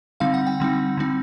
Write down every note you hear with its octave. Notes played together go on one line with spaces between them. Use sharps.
D3 G3 C4 D#4 F5
F#5
G5
D3 G3 C4 D#4
D3 G3 C4 D#4